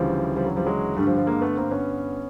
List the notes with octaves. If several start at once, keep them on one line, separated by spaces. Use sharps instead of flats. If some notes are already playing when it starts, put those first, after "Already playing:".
Already playing: D2 C#3 E3 F3 G3
F3 G3
F#3
F3 G3
F#3 G#3
G2 D3 G3 A3
F3 G3
F3
G#3 A#3
A3 B3
A#3 C4
B3 C#4